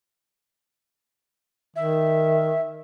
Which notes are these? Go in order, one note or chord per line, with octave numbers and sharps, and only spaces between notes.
D#3 E5